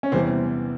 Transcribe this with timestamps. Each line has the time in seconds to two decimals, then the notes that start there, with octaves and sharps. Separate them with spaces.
0.03 C#4
0.12 E2 C3 E3 G3 C4